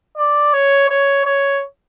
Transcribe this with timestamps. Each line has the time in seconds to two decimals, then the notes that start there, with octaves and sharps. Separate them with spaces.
0.17 D5
0.53 C#5
0.90 C#5
1.25 C#5